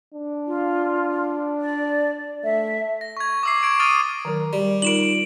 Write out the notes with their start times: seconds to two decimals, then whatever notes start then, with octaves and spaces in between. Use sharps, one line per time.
0.14 D4
0.47 F4
1.61 D5
2.44 A3 E5
3.01 A#6
3.17 C#6 G#6
3.43 D6 E6 C7
3.63 C#6 G#6 D7
3.79 D#6 F6 A6 D#7
4.25 D#3 F#3 A#4
4.53 G3
4.82 D#4 F4 A#4 D7 E7 F#7